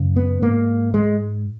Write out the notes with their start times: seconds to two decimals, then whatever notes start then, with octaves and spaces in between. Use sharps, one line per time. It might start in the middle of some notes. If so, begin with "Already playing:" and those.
Already playing: F#2 C#3
0.16 B3
0.42 G#2 A#3
0.94 G#3